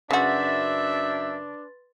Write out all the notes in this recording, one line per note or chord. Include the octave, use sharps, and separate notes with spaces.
F#2 C#3 D4 F#4 B4 E5 C6 A6